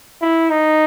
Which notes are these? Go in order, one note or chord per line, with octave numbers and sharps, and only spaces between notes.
E4
D#4